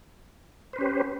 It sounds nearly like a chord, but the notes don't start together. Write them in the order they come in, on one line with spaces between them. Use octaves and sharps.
C5 B4 C#4 G4